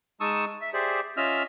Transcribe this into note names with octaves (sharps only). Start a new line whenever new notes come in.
G#3 D#4 A5 C#6 D#6 E6
E5
G4 G#4 C5 D5 E5
C#4 F4 D#5 E5 E6 F6